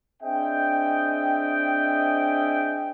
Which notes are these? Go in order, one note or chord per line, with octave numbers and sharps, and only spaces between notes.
C4 D4 G#4 D#5 E5 G5